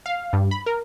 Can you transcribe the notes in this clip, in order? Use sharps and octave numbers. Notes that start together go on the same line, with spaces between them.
F5
G2
B5
A#4